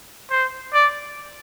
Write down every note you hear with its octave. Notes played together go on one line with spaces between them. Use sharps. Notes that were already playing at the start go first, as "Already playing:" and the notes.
C5
D5